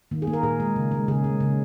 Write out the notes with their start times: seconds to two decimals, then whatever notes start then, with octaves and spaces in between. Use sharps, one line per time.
0.11 D#3 A#3
0.22 G#4
0.27 A#3
0.33 A#4
0.43 A#2 G#4
0.60 G#3
0.76 C#3
0.92 G#3
1.08 C#3 G#4
1.24 G#3
1.40 C#3